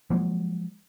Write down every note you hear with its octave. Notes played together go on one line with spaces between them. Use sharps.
F3 F#3 G#3 A#3